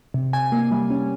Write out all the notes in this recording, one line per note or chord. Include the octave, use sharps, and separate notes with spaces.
C3
C3 G#5
A#3
G3
C#4